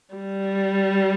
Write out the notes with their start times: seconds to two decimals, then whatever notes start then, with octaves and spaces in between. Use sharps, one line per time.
0.14 G3